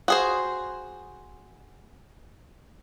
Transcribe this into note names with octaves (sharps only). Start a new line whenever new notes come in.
F#4 G#4 C5